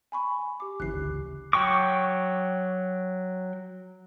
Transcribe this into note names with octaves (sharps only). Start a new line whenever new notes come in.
G#5 B5 C#6
G4 D6
G#1 C#3 E3 F#6 C7
D2
F#3 G5 C#6 D6